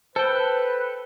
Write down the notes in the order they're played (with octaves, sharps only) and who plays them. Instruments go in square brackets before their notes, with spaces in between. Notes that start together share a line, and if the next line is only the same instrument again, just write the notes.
[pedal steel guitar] A4 G5 [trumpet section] B4 [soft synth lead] C5